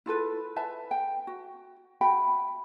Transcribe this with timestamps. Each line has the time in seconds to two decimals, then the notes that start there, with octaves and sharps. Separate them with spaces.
0.06 E4 F4 A4 B4
0.56 B4 E5 A5
0.91 G5
1.27 F#4
2.01 F#4 E5 G5 B5